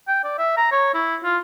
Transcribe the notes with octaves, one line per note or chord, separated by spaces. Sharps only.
G5
D5
E5
A#5
C#5
E4
F4